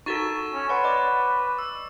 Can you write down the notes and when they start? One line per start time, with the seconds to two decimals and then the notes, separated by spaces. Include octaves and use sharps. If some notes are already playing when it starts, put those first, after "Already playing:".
0.06 D#4 F#4 A4 C#6 A6 E7
0.54 C#4
0.69 B4 C#5 F#5 C6
0.84 D5 D#5 D6
1.58 E6